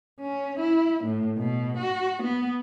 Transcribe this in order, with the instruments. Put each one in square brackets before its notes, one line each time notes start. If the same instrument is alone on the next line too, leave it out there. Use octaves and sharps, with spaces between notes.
[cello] C#4
E4
A2
B2
F#4
B3